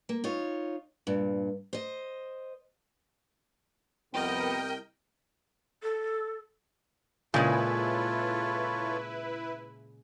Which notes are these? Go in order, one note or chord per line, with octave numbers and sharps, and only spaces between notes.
A#3
D#4 F4 C#5
G2 A#2
C5 D#5
C2 F2 C3 B3 A#4 D#5 G5
A4
A#2 C#3 G#3 E4 F4 A4 B4 C#5